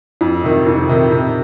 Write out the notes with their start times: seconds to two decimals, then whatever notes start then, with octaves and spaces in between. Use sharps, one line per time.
0.21 F2
0.44 C3 D#3
0.67 F2
0.89 C3 D#3
1.12 C3